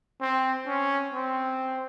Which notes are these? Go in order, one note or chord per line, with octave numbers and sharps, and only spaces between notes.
C4
C#4
C4